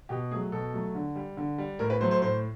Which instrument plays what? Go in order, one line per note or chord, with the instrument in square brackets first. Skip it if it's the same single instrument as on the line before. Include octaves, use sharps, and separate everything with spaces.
[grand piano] B2 G4
A3 G#4
F#3
B2 A4
F#3 A3
D3
G3
D3
G3
A2 A#4
B4
F#3 A3 C5
C5
A2 C5